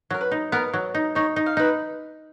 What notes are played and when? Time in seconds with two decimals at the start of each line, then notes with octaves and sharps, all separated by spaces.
0.10 F#3 A#4
0.21 B4
0.31 D#4
0.52 B3 A#4
0.73 F#3
0.95 D#4
1.15 D#4 C#5
1.36 D#4
1.46 F5
1.57 D#4 B4